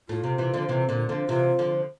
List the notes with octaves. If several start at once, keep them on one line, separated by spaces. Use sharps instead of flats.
A2 F4
C3
C3 E3
D3 F3
C3 E3
A#2 D3
D3 F3
C3 E3 F4
D3 F3